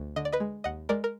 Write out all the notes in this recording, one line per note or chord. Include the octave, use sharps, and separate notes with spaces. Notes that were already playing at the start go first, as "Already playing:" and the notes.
Already playing: D2
D3 D#5
D5
B4 D#5
G#3
D#2 D#5 F#5
G#3 A#4 D5
A#4